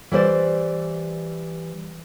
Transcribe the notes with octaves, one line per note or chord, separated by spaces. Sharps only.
E3 G3 C5 D5